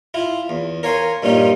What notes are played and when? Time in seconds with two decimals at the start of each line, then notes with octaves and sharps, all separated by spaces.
0.14 E4 F4
0.49 E2
0.83 A#4 C#5 F5 G#5 C6
1.23 G2 A#2 C#4 D#4 F4